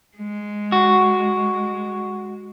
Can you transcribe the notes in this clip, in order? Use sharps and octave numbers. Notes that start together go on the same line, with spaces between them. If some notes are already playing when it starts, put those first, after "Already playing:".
G#3
F#4